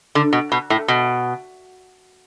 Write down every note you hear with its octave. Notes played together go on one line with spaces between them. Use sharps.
D3
B2
B2
A2
B2